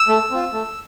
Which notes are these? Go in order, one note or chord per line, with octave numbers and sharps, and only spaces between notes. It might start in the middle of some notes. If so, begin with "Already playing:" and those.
Already playing: E6
A3
C4 F4
A3